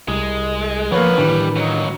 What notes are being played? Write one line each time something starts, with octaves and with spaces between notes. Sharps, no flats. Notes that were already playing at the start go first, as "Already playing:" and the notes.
C2 G#3
F3 A#3 B3 F4 B4 C#5
A2 D#3 E3 G3 D4
C#2 F#3 D#4